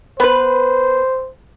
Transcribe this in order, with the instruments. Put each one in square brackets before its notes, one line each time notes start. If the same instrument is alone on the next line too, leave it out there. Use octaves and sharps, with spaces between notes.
[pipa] B3 B4 [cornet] C5